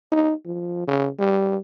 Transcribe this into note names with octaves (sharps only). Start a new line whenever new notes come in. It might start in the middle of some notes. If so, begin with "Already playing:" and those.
D#4
F3
C#3
G3